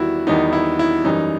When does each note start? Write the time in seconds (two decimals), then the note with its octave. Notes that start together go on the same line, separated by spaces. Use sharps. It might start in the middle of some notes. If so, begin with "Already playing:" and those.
Already playing: E2 D#3 G3 B3 E4 F#4
0.27 E2 D#3 G3 B3 D#4
0.53 E4
0.79 E4
1.04 F#2 E3 G3 D#4